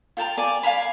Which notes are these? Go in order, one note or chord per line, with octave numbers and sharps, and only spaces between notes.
F4 G5 A5 A#5
D5 G#5 D6
F5 G#5 A#5 B5